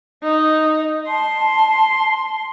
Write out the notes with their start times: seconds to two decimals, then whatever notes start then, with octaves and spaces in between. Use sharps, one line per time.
0.23 D#4 D#5
1.08 A5 C6